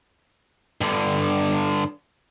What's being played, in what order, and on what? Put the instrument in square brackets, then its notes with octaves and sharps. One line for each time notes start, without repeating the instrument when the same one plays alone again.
[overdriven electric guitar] G2 D3